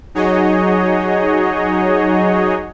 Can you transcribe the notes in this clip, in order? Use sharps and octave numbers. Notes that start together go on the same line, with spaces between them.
F#3 D#4 F#4 G#4 C#5 D#5